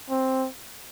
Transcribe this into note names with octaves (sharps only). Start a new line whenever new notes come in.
C4